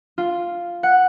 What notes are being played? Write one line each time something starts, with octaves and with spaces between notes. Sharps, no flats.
F4
F#5